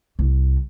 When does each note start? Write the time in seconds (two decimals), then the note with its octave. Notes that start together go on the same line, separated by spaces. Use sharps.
0.19 C2